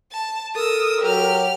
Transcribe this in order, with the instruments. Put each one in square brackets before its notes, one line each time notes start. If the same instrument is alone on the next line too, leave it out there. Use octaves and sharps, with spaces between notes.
[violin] A5
[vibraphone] A4 [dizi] A#4 [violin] D#6 E6
[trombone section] F#3 [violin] G4 F6